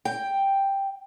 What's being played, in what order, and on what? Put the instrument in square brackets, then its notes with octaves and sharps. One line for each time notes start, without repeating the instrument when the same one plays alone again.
[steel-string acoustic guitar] G5